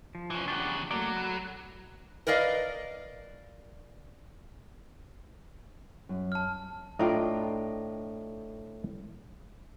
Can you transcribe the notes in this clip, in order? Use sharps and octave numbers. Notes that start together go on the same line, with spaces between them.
F3
E3 C#4
E2 C#3 D4 G4 F#5
F#3 A3 A#3 D5
A4 B5 F#6
A#4 B4 D5 D#5 F5
F#2
A5 F6
A2 D4 F4 D#5 G5 A#5